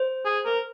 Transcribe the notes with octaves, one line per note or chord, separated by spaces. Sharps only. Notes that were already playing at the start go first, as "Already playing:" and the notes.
Already playing: C5
G#4
A#4